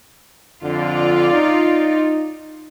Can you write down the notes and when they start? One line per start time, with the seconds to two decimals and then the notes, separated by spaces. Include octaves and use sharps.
0.63 F2 D3 F4 D5
1.33 D#4